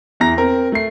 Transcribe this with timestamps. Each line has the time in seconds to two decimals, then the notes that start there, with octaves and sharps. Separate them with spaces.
0.20 E2 E4 A#5 A#6
0.37 C4 A#4
0.72 A3 C7